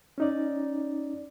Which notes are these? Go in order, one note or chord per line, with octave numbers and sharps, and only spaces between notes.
C#4 D#4 D5